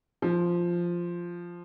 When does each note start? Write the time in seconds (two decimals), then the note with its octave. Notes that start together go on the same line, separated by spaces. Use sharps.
0.22 F3